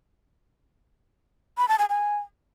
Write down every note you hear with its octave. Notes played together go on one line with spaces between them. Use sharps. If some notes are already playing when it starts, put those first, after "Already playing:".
B5
A5
G#5
G#5